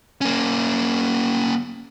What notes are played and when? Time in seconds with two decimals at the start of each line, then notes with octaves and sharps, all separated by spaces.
0.21 A#3 C#4